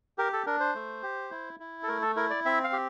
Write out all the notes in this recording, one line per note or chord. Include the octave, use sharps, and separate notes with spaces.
G4 A#4
A4
D4 A#4
C5
A3
G4
E4
E4
A4
A3 A#4
A4
E4 A#4
D5
C4 E5
F5
G4